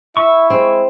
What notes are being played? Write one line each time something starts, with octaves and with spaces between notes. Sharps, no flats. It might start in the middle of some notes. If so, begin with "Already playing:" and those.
E4 E5 C#6
G#3 C4